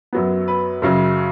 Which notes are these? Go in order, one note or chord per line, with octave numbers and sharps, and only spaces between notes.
F#2 F#3 B3
B4
F#2 C#3 F#3